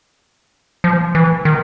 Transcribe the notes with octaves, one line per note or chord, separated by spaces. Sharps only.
F3
E3
D#3